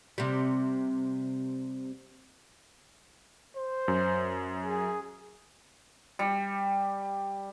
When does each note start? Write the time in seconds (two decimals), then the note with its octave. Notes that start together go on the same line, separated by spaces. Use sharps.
0.18 C3 G3
3.57 C5
3.88 F#2
4.65 G#4
6.19 G3